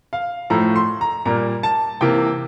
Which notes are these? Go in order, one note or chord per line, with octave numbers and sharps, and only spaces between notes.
F5
A2 F3 A3 A#5
C6
A#5
A#2 G3 A#3 A#5
A5
C3 E3 A#3 G5